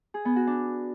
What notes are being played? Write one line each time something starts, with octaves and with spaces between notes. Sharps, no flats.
G#4
B3
F#4
D4